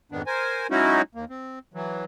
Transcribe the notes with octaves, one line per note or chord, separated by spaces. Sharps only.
F2 G#2 D#3 B3 D4
A#4 C5 G#5
F#3 G#3 C#4 D#4 E4 F#4
D#2 A#3
C4
E3 F#3